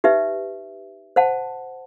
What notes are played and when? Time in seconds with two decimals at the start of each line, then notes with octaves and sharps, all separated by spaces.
0.04 D#4 G4 B4 E5
1.16 C5 F#5 A5